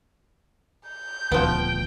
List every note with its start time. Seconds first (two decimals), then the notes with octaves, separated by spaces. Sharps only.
0.88 G6
1.32 D#1 G#1 D2 F3 B3 G5